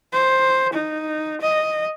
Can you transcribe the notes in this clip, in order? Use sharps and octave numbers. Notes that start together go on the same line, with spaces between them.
C5
D#4
D#5